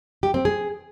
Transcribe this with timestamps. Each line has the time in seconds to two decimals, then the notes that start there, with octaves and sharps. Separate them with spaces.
0.23 G4
0.34 C4
0.45 G#4